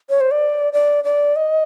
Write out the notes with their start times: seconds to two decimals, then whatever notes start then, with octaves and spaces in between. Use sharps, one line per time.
0.10 C#5
0.21 C5
0.31 D5
0.73 D5
1.04 D5
1.36 D#5